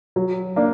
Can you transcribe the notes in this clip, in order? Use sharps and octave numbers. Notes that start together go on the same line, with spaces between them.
F#3
A#3 D4